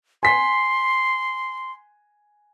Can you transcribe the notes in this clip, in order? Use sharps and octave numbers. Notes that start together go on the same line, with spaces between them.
G#5 C6 B6